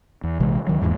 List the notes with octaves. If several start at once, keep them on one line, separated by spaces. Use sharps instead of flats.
E2
A#1 C3 E3 G#3
D2 D#3 F#3
D#1 G#1 E2 G#2